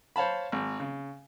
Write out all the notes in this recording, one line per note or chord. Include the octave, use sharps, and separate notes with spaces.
C5 C#5 F5 A5 B5
G#1
C#3